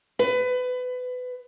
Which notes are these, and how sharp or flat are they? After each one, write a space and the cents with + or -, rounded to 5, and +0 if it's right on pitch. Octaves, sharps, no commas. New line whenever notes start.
B4 +25